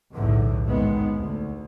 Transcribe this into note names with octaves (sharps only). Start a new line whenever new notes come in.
B1 E2 A2 D3
G#1 D#2 D#3 G#3 B3
D2